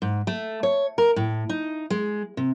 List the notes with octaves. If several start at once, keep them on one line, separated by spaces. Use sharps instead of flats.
G#2
A3
C#5
A#4
A2
D#4
G#3
C3